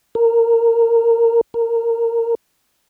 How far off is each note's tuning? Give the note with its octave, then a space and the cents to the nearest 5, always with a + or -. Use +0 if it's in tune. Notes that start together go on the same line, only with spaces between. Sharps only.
A#4 -15
A#4 -15